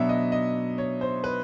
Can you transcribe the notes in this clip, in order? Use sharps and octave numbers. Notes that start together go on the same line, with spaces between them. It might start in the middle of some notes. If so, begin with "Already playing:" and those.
Already playing: B2 F#3 B3 D4 E5
D#5
D#5
C#5
C5
B4